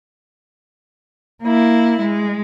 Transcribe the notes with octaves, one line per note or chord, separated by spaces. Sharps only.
A#3 E4
G#3